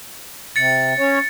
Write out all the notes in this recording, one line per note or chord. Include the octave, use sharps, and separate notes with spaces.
C3 A6 C#7
C#4 C#5